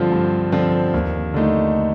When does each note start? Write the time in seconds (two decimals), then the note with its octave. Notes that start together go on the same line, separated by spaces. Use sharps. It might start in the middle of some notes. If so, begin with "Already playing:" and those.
Already playing: G2 D3 F3 C4 F4
0.12 G2
0.52 D3 F3 C4 F4
0.94 D#2
1.34 D3 A3 D#4